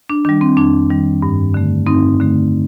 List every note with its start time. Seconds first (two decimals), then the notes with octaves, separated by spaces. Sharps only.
0.09 D4
0.25 D#3 G3 D4
0.41 C4
0.57 F2 D4
0.90 D#3 G3
1.22 G2
1.54 D3 A3
1.86 G2 C4 D#4
2.20 D3 A3